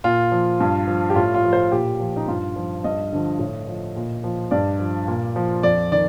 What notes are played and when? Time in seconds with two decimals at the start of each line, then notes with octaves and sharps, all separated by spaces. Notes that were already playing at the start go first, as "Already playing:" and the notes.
0.04 A#2 F4
0.32 F3
0.60 G2
0.87 F3
1.10 G4
1.15 A2 F4
1.35 F4
1.44 F3
1.53 C5
1.72 A#2 G4
2.00 F3
2.16 D#4
2.28 G2 F4
2.56 F3
2.84 G2 D#5
3.12 D3 F3
3.39 A2
3.67 F3
3.96 A#2
4.24 F3
4.51 G2 D5
4.79 F3
5.08 A#2
5.36 F3
5.63 F2 D5
5.92 D#3 D5